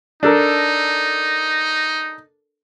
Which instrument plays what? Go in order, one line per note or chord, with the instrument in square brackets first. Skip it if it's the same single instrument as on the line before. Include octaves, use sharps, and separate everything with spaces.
[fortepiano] D4 A4 A#4 [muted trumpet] D#4